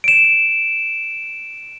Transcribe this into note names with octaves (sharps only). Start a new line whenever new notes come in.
D7 E7